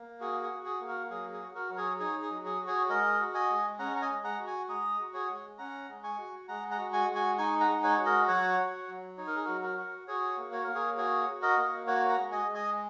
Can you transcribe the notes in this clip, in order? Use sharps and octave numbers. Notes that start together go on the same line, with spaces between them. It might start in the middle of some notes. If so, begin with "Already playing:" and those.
Already playing: A#3
F#4 G#4
G#4
F#4
G#4
A#3
F#4 A#4
F#3 G#4
G#4
F#4
F#4 A#4
F#3 A#4
G#4 C#5
D#4 G#4 C#5
G#4
F#3
G#4
F#4
G#4 C#5
G#3 A#4 D#5
F#4
D#5 G#5
G#3
C#4 F#5 A#5
A#5
D#5 G#5
G#3
F#5 A#5
F#4
G#5 C#6
G#3 A#5 D#6
F#4
G#4 C#5
G#3
C#4 F#5 A#5
G#3
G#5 C#6
F#4
G#3 F#5 A#5
F#5 A#5
F#4
G#5 C#6
G#3
G#5 C#6
D#4 G#5 C#6
F#5 A#5
G#3
C#5 F#5
F#4
A#4 D#5
F#3 C#5 F#5
F#4
F#3
D#4 C#5
A#4
G#4
F#3 F#4 A#4
F#4 A#4
F#4
F#4 G#4 C#5
A#3
C#5
A#3 A#4
G#4 C#5
F#4 G#4 C#5
F#4
A#4 D#5
A#3
F#4 C#5 F#5
F#5 A#5
G#3
D#5 G#5
G#3
D#5 G#5